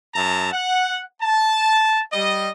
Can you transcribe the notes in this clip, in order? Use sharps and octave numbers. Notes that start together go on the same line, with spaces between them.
F#2 E5 A5 A#5
F#5
A5
G3 D#5